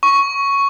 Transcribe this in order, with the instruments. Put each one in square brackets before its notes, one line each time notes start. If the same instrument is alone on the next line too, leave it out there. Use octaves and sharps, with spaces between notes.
[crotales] C#6